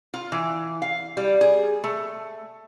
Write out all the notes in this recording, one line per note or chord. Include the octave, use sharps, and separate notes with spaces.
F4
E3
F5
G3
G#4
A3